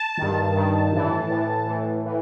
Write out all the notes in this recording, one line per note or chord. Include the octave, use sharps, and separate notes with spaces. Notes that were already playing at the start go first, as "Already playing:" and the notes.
Already playing: A5
G2 D#3
G2 D#3
A2 E3
A2 E3
A2 E3
A2 E3